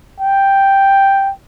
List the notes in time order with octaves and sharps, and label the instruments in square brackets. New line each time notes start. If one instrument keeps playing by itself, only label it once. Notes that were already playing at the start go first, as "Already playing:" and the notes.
[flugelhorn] G5